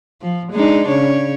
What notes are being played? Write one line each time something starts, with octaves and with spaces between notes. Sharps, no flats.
F3
G#3 D4 D#4
C#3 C#5